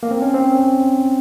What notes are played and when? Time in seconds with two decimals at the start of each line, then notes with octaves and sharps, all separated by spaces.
0.03 A#3
0.11 C4
0.22 C#4
0.34 C4